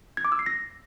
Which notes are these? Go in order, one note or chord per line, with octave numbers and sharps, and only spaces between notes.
G#6
D6
E6
C7
A#6